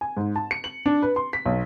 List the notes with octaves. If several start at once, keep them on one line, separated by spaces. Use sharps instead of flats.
G#5
G#2
A5
C#7
F#7
D4
B4
C6
B6
B1